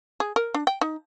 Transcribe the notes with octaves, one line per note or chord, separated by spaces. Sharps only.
G#4
A#4
D4
G5
D#4